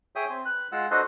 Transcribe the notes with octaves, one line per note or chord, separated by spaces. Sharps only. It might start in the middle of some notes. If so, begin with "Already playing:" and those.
G#4 C#5 E5 G5 D#6
C4
B4 F#6
G#3 F4 F#5 E6
D4 F#4 A4 B4 C5 D#5